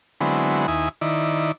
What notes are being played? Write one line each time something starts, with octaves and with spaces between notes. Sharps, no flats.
D3 F#3 G#3 B3 C4 E4
D#2 E4 G#5 D#6
D#3 E4 D5